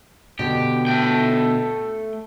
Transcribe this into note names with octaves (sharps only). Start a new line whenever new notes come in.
B2 D3 G4
A3 G5